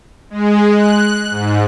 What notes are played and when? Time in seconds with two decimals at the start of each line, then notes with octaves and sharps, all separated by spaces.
0.30 G#3
0.74 F#6
1.30 G#2